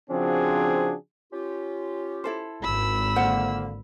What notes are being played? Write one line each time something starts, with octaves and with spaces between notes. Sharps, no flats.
C#3 F3 C4 D4 F#4 G#4
C#4 F4 G4
E4 A4 C5
G#1 B5 E6
D3 A#3 F4 C5 F#5